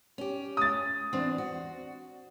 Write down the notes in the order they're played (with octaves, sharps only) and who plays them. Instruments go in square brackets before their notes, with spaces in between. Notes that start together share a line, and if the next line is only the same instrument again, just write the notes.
[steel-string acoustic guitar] C#4 G4
[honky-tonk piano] D#6 A6
[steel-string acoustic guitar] E2 C4 D4
F#4